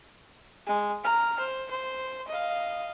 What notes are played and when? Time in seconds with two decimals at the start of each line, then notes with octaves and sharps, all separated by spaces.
0.67 G#3
1.03 A#5 F6
1.40 C5
1.71 C5
2.28 D#5 F5